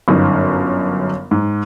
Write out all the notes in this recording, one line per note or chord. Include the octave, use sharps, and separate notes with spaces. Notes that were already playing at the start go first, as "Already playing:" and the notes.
G1 F#2 D#4
G#2